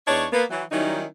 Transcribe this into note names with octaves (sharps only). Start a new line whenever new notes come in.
E2 D4 D#4 C#5
A#3 B3
E3 F#3
D#3 F#3 G3 C#4 D#4 E4